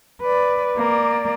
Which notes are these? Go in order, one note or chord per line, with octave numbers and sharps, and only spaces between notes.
B4 D5
A#3 D5